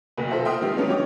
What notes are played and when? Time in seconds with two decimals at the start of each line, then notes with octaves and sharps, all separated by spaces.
0.18 F#1 D2 B2
0.31 F4 A4 C5 E5
0.45 E5 G5 C6 D#6 F6
0.61 D#3 G3 G#3 B3
0.77 E3 F#3 B3 C#4 D4
0.89 G4 C#5 D#5 D6